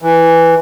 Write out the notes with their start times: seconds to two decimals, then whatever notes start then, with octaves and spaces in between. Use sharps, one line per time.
0.02 E3